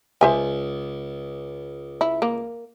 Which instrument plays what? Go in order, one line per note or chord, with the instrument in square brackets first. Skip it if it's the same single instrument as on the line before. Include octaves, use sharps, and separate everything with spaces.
[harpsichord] C#2 [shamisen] C5 E5 G#5
[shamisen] E4
A#3